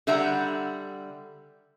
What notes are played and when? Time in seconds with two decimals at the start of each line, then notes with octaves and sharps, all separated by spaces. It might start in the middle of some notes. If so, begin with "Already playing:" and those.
0.07 D3 G3 E5 F#5 A#5